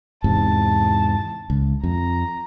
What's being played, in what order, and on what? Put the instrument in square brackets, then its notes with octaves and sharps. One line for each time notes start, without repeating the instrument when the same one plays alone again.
[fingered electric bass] E2 G#2 C3 [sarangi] A5
[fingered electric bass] C#2
[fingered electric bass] F2 [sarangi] A#5